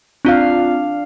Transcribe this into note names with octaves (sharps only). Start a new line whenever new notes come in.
C4 D4 F4 F5